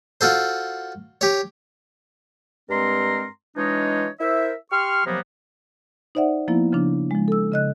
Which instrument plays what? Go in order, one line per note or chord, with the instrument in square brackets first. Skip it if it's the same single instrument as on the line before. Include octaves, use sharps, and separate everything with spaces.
[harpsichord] F4 F#4 A4 C5
G4 C#5
[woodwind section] G2 G#3 C4 A#4 A#5 C6
E3 G#3 D4 D#4 C#5 D#5
E4 A#4 C5 E5
G4 C6 C#6 F6
C3 F3 F#3 A#3 B3
[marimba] D#4 C5 D5 E5 F#5
F3 A#3 B3 E4
C#3 F3 D4
F3 G#3
A4 E6
C#3 D#5 F#6